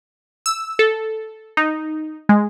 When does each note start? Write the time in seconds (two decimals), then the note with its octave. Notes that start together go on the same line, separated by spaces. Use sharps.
0.46 E6
0.79 A4
1.57 D#4
2.29 G#3